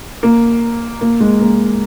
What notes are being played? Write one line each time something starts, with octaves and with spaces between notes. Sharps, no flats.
A#3
A#3
G#3
A#3